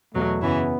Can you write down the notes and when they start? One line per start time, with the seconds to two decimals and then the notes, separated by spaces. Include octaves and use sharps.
0.14 E2 B2 F#3 A3
0.42 F#2 C#3 E3 B3 C#4 E4